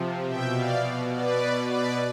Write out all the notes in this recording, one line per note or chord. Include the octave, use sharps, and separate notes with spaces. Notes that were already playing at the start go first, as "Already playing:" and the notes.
Already playing: C3 F3
B2 E5 G5
D5 F5
B2
B4 D5
B2
B4 D5